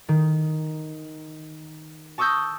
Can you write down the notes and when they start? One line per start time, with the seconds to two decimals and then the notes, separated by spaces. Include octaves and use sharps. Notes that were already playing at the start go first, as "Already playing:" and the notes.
0.09 D#3
2.18 A5 C#6 D#6 E6 G6 A#6